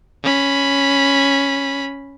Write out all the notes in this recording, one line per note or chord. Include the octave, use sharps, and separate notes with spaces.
C#4 B5